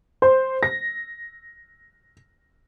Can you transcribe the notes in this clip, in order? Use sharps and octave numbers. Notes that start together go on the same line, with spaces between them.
C5
A#6